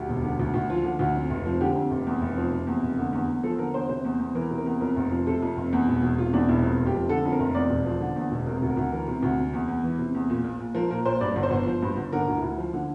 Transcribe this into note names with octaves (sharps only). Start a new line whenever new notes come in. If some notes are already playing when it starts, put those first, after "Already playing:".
Already playing: D2 G4
E1
D3
D2
D2
F3 F4
D3
D2
F2
F1
F3
D3 G4
F2
F1
E2
F1
F3
C3
E2
F1
D3
E2
E2
F3 A4
D3 A#4
E2 C5
C3 C5
E2
E2
E3 A#4
C3
A#4
E2
F2 A#4
F1
F3
C3 A4
F2
F1
E2
E1
E1
C3 F4
E2 D4
E1 E4
F2
F1
G4
F3
D3 A4
F2
A#4
F1
E2 D5
E1
F3
D3
E2
E1
C3 A#4
D2
A#4
D2
E3 A#4
C3
D2
C3
E2
E2
E3
C3
E2
A#2
A#1
A#1
F3 A#4
A#2 A#4
A#1 C5
G2 D5
G1
C5
G1
F3
G2
G1
D3 A#4
D2
E4
D2
F3
D3